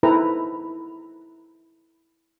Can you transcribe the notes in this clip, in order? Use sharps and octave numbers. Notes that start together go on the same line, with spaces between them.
D#4 E4 A4 B4 C5 A#5